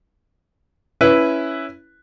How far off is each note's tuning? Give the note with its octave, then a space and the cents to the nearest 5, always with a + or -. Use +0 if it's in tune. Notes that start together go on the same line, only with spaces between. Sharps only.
C#4 +0 E4 +0 B4 +0